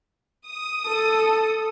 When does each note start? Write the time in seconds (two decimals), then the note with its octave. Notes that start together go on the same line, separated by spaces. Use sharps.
0.47 D#6
0.86 A4